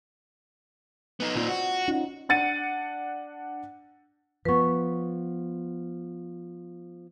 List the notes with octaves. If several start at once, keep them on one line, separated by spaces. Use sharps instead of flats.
B3 D#4
A#2 C4 D#4 F4 D5
F#4
C#4 D#4 F4
D4 F#5 A6 C#7 D#7
F3 B3 B4 C#6